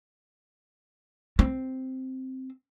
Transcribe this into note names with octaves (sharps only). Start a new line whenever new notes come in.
C4